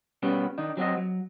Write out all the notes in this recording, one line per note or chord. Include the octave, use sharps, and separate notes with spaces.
B2 G3 B3 C#4
D#3 D4 D#4
F#3 C4 F#4 D#5
F#3